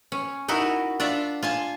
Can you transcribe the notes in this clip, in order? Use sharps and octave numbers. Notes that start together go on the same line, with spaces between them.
C#4
D#4 E4 F#4 A#4 D#5
D4 F4 D5 E5 F#5
F4 G#5 A5